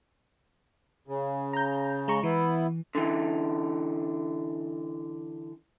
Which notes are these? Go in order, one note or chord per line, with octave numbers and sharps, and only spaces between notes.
C#3
A#5 G6
G#3 A#5 C#6
E3 B3 E4
D3 E3